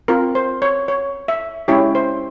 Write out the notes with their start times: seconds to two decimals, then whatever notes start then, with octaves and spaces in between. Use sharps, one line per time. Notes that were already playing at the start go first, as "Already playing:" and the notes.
0.08 C4 F4 A#4
0.35 C5
0.62 C#5
0.88 C#5
1.28 E5
1.68 G#3 C#4 E4 G4 C#5
1.95 C5